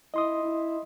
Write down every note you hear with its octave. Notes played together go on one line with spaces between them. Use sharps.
E4 D#5 C6 D#6
E4